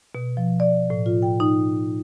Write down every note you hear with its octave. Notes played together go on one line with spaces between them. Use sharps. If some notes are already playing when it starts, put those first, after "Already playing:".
B2
F3
D5
A2
F4
G5
D#4